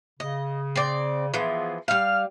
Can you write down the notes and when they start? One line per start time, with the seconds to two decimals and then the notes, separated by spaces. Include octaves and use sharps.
0.20 C#3 D#5
0.76 C4 D5
1.34 E3 F3 B3 F4 G#4
1.88 G3 F5 F6